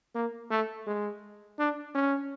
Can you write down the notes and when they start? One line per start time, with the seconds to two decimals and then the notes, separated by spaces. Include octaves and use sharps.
0.15 A#3
0.51 A3
0.87 G#3
1.59 D4
1.95 C#4